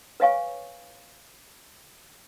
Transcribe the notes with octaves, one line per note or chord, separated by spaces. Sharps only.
B4 C#5 D#5 F5 G#5 C#6